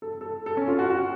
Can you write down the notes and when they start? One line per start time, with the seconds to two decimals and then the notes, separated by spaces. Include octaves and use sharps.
0.02 A4
0.21 A4
0.46 A4
0.57 C#4
0.68 F4
0.79 F#4
0.90 F#4